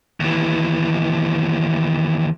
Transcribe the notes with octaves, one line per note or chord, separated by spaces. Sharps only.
D#2 E3